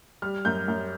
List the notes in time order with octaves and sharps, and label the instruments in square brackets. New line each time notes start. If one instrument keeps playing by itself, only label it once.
[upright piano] G3 F6
F#2 G6
F#2